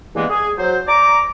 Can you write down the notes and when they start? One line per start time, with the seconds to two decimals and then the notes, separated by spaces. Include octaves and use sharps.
0.15 E2 G2 E3 G#3 A#3 B3
0.30 G#4
0.58 F#3 C5
0.87 D5 A#5 D6